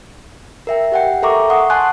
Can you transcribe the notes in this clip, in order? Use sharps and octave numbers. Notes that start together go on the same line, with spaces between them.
A#4 E5 G5
G4 F#5 G5
A4 A#4 E5 A#5 C#6 D6
F#5 C#6 D#6
F#5 G#5 A5 C6 F#6